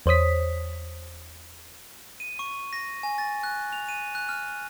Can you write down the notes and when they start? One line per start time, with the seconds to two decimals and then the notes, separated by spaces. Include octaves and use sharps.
0.06 E2 C5 C#5 D#6 B6
2.20 D#7
2.39 C#6
2.73 A#6
3.03 G#5
3.18 A6
3.43 F#6
3.73 F7
3.88 D#7
4.15 F#6
4.29 F6